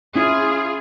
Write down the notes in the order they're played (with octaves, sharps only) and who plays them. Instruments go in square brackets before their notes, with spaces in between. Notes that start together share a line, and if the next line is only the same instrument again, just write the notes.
[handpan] C#4 E4 [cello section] F4 G#4